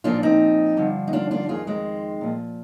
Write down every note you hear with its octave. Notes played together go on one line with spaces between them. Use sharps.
A#2 F3 D4 F4
C4 D#4
G2 D3 F3
D#4
D4 F4
D4 F4
F2 D#3 F4 G#4
G#3 C4
A#2 F3